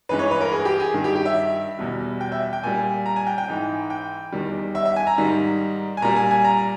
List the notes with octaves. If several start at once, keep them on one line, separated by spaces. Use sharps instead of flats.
G2 E3 G#3 B4
C#5
B4
A#4
G#4
G4
G#4
G2 D#3 G3
G4
G4
E5
E2 B2 G3
G5
E5
G5
A#2 G3 G#5
A#5
G#5
G5
G5
G#2 E3 G#3
G5
E2 D#3 G3
E5
E5
G#5
A#5
G#2 D#3 G3
G#5
A#2 G3 A#5
G#5
G#5
A#5